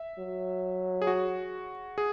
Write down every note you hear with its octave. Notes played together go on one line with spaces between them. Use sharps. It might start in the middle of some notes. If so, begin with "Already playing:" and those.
Already playing: E5
F#3
G#4
F#4
G#4